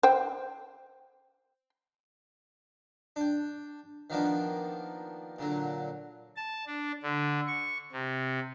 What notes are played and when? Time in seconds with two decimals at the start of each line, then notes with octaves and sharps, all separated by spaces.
0.03 C5 G5
3.16 D4 G5
4.10 D#3 F3 A#3 B3 D4
5.39 A#2 D3 F#3
6.36 A5
6.67 D4
7.03 D3
7.47 C#6
7.92 C3